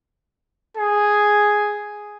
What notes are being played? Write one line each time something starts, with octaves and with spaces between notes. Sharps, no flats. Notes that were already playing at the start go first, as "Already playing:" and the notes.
G#4